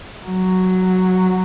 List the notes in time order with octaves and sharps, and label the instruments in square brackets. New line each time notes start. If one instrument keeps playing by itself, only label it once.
[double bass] F#3